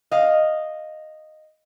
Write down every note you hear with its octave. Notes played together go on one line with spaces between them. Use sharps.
D#5 F5